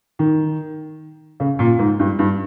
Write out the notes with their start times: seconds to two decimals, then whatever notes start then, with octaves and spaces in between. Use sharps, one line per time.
0.19 D#3
1.40 C#3
1.59 A#2
1.79 G#2
1.99 G2
2.19 G2